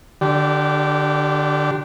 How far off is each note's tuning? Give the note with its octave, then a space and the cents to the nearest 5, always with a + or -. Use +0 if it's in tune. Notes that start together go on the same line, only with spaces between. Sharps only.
D3 +15 D4 -25 G4 -20